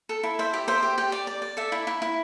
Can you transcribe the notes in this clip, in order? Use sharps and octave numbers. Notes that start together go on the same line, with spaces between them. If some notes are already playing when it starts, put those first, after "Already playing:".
A4
E4
C5 E5
G4 E5
C5 E5
G4
G4 G5
D5
D5
D5
A4 E5
E4
E4
E4